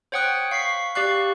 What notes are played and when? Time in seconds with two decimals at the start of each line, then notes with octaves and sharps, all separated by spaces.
0.12 C5 C#5 F#5 G5 D#6 F#6
0.51 F5 C#6 B6 C7
0.95 G4 D5 F5 C#6 F#6